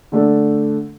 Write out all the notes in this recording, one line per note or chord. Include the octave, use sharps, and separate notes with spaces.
D3 A3 D4 A4